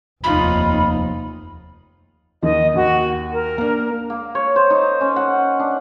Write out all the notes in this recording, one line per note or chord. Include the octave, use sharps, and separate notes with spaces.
F1 D#2 D#4 F4 B5
D#2 D#3 D#5
D#2 F#4
A#4
A#3 D4
A#3
C#5
C5
D#4
C#4
F#5
D4